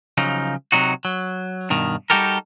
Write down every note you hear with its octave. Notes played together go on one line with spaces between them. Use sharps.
C#3 F3 F#3 D#4
C3 F#3 D#4 F#4
F#3
G2 B2 D#3
G3 D#4 F#4 G4 A4 A#4